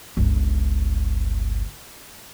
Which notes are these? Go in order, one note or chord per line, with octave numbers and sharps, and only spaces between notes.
G1 C#2